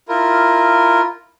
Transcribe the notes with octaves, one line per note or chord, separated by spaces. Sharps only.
E4 F4 A#4